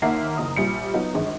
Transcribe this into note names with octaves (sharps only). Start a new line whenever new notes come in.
D#2 D#3 A#3 E5 F#5 C7
F#1 A#5 D#6
A#1 G3 C#7
F#3 B3 D#4 F4
G#1 G2 G#3